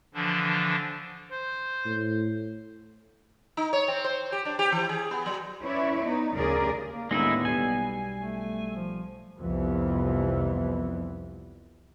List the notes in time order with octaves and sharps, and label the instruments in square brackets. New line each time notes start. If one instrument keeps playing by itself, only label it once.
[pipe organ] D3 E3 F3 D4
[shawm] C5
[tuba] A2
[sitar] D#4
C#5
C4
C5
G4
D4
G4
E3
G#4
B3
F#3
[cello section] C#4 E4 B4 C#5 D5
B3 D#4
D2 C#3 C#4 G#4 A#4 D5
[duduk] A#3
[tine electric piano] D#2 A2 D3 [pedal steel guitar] G#3 D#4 E4 [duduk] B3
[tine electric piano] B1 G3 C7 [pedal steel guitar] G#5
[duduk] A3
F3
[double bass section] C2 F2 E3 B3